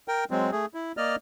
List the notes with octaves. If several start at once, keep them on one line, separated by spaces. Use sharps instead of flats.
A#4 G5
F#3 G#3 C4
A3 G#4
E4
A#3 D5 D#5 F6